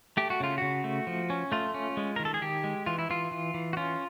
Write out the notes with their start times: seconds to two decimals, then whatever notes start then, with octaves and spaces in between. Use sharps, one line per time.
0.17 A3 G4
0.30 F#4
0.40 C#3 F4
0.58 C#3 F#4
0.84 A3
1.07 F3
1.30 C#4
1.52 A3 F4
1.74 C#4
1.97 G#3
2.16 D#3 A#4
2.25 A4
2.34 G#4
2.42 D#3 G4
2.64 G#3
2.86 E3 F4
2.99 E4
3.10 E3 F4
3.31 E3
3.54 E3
3.73 F#4
3.77 C#4 F4